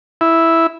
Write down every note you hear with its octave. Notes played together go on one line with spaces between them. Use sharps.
E4